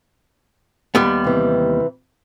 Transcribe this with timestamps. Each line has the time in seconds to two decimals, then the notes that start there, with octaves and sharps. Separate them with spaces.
0.95 D#2 G3 B3
1.24 C3 E3